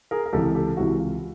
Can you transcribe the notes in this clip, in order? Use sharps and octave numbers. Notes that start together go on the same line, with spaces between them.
G#4 A#4
A#4
C#2 C3 E3 G4 A4
G4 A4
C#2 C3 E3 E4 F#4
F4